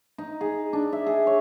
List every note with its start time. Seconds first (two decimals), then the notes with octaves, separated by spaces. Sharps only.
0.18 D#4
0.41 G#4
0.73 D4
0.93 E5
1.07 G#4
1.27 C#5